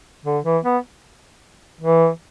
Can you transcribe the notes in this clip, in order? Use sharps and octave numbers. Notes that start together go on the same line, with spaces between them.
D3
E3
B3
E3